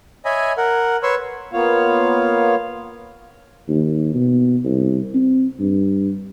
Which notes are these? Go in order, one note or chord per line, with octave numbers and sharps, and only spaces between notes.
C#5 D#5 E5 G#5 B5
A#4 F#5
B4 C#5 C6 C#6 E6
A#3 B3 F4 C#5 F5
D#2
B2
C2
C4
G2